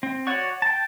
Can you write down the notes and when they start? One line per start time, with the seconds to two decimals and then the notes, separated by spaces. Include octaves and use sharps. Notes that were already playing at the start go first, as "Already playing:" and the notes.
0.03 C4
0.27 F#4 C#5 D5 F#5 C#6
0.62 G5 A5